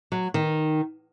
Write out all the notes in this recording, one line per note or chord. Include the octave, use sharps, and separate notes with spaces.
F#3
D#3